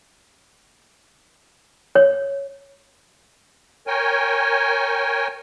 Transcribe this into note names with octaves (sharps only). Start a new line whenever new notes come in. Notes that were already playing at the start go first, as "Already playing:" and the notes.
C#5
A#4 C#5 G5 G#5